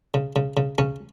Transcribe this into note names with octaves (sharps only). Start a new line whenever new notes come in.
C#3
C#3
C#3
C#3 C#4